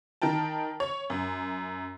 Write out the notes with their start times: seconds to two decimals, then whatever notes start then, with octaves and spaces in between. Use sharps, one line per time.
0.22 D#3 A#4 G5 A5
0.80 C#5
1.10 F#2